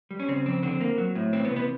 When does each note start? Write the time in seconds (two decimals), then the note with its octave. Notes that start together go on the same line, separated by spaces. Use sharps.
0.11 G3
0.20 C#4
0.28 C#3 C4
0.46 F2 C4
0.63 D3 C4
0.81 A#3
0.98 F#3
1.15 A2
1.33 E3 C4
1.45 B3
1.51 C3
1.56 B3